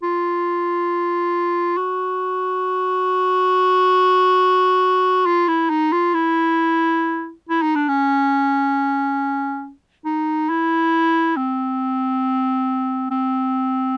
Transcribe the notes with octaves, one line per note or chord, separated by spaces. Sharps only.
F4
F#4
F4
E4
D#4
F4
E4
E4
D#4
D4
C#4
D#4
E4
C4
C4